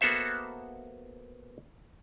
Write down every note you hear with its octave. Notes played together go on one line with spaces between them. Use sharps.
A#3 B3 F#4 A4 C5 E5